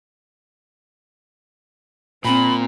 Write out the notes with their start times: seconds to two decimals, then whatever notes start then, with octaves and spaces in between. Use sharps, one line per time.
2.25 A#2 C4 B5